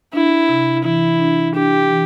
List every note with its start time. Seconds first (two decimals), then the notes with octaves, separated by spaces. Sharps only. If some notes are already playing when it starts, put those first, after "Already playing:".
0.13 D4 E4
0.49 C3
0.84 E3 E4
1.20 D4
1.55 D4 G4
1.90 E3